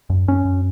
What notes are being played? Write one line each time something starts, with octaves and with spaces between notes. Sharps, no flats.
F#2
F#2 C#4
F#2